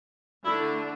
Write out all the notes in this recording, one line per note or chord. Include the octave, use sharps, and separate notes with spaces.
D3 A3 D4 E4